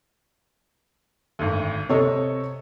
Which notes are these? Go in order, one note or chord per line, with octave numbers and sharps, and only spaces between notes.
G#1 D2
C3 A4 C#5 D#5